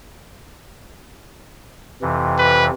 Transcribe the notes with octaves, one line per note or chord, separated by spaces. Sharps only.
F2 C3 E3
B4